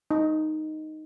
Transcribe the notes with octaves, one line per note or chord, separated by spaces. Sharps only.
D#4